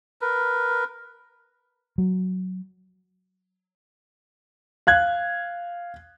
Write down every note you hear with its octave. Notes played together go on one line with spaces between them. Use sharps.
A#4 B4
F#3
F5 F#6 G#6